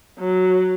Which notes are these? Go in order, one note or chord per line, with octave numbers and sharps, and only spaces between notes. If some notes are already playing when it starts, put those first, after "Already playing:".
F#3